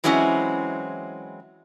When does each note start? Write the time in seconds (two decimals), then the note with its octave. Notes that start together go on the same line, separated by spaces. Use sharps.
0.04 E3 F#3 G#3 C4 C#4 E4